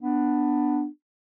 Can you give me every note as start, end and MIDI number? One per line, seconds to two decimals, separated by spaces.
0.01 0.86 59
0.01 0.86 62